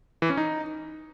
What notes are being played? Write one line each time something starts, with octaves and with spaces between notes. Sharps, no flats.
E3
C#4
D#4